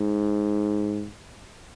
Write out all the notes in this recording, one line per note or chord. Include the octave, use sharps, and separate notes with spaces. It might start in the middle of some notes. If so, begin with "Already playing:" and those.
Already playing: G#2